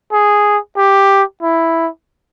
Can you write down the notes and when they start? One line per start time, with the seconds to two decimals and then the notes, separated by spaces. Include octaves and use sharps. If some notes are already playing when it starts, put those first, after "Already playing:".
0.12 G#4
0.77 G4
1.42 E4